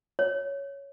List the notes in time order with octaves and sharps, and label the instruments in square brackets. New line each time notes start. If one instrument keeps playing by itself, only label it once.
[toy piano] C#5